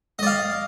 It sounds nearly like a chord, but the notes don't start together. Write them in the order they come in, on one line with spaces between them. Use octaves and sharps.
D#5 D5 F5